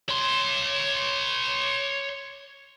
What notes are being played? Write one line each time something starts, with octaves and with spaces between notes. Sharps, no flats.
C#5 C6